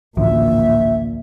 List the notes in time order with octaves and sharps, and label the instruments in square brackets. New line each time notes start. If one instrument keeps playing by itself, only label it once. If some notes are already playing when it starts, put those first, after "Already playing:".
[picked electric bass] A1 D2 F3 [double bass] A#2 [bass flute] E5